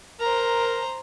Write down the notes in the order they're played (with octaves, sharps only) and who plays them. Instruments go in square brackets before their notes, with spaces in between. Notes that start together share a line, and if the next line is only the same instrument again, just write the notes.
[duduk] A#4 [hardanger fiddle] C5 A#5